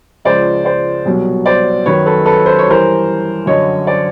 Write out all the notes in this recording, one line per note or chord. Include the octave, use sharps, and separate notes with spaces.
C#2 C#3 F3 C5 D5
C5 D5
C2 B2 F#3
C5 D5
F#2 D#3 F#3 B4 C#5
A4 B4
A4 B4
C5
C#5
G2 E3 A#4 C5
F#2 D3 F#3 C#5 D#5
C5 D5